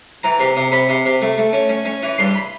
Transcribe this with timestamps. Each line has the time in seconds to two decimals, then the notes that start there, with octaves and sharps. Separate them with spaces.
0.23 E3 A#5
0.40 C3
0.56 C3
0.72 C3 B5
0.89 C3
1.05 C3
1.22 A3
1.38 A3
1.53 C#4
1.69 C#4
1.85 C#4
2.03 E3
2.18 G2 C6
2.35 B5